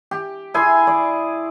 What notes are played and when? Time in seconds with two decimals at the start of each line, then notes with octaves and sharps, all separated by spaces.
0.11 G4
0.54 E4 G#4 G#5 C6
0.87 D5